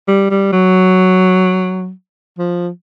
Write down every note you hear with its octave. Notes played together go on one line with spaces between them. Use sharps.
G3
G3
F#3
F3